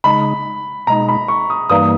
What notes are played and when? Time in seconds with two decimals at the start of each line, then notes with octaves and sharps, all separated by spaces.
0.04 C#3 G#3 D#4 B5
0.87 B2 G#3 D#4 A#5
1.08 B5
1.28 C#6
1.50 D#6
1.70 G2 E3 G3 A#3 D#4 D#6